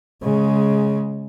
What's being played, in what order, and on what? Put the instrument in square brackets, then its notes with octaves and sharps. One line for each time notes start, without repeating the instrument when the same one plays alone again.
[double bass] C#3 G#3